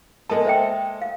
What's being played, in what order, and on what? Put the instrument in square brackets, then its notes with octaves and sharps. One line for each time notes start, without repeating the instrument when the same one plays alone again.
[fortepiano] G#3 A#3 A4 [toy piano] A5
[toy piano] C5 E5 G5
F5